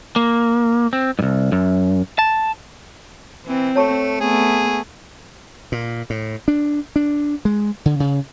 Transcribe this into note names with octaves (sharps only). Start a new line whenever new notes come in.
A#3
C4
C2 G2
F#2
A5
E3 C4
A3 C#5 A5 C#6
A3 B3 G#4
A#2
A2
D4
D4
G#3
D3
C#3